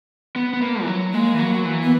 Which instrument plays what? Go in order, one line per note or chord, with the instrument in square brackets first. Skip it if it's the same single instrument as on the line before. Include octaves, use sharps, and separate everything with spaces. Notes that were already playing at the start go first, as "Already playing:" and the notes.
[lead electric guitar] B3
B3
A#3
E3
F#3
[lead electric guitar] G#3 [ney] A#3
[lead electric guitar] E3
F#3
F#3
E3
[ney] B3